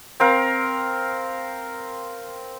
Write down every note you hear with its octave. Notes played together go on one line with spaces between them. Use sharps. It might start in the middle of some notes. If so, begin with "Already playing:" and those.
C4 A#4 F5